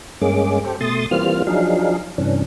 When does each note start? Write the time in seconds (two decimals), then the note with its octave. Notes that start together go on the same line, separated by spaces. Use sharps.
0.21 G2 G#3 A#3 C#4 G#4 D6
0.65 G4 A4 C5
0.81 B2 A3 C6 D#6 A6
1.11 E3 G3 A#3 C4 F4 F6
1.47 F3 F#3 D4 D#4 G#4 F5
2.18 G2 C3 E3 C#4 D4